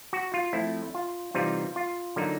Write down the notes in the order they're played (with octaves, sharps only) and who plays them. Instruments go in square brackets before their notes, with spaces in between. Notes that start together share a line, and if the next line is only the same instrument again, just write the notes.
[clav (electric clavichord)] F#4
F4
F3 A3 C4 E4
F4
C3 E3 G3 C4 D#4 F4
F4
D3 F#3 A#3 D#4